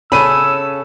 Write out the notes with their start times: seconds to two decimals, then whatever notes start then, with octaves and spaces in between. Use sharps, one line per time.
0.12 C#3 C#4 A4 B5 E6 D#7